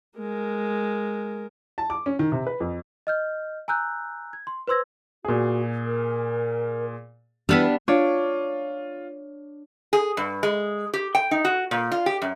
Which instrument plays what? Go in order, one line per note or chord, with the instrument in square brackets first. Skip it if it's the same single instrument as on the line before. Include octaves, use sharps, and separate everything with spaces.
[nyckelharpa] G#3 A#4
[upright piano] A5
D6
C#4
D#3
C3
B4
F2
[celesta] D#5 F6 G6
G#5 A#5 E6 F#6 G6
G#6
C6
B4 C5 C6 E6 G#6 A#6
[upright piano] A#2 G#4 [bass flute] F#4
[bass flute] A#4
[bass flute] E3 [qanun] G3 B3 B4 [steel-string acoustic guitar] D4 [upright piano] E6 F6 E7
[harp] D4 C#5 D5 [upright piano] F4
[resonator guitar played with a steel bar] G#4
G2
G#3
G4
G5
D#4
F#4
A#2
F4
G4
F#2